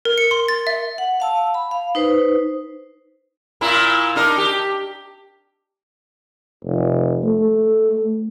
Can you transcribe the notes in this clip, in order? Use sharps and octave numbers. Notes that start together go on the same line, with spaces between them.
A#4
C#7
C6
A6
E5
F#5
F5 A5 E6
B5
F5
D#4 B4 C5
A#2 A#3 E4
D4 D#4 A#4
G4
F1
A3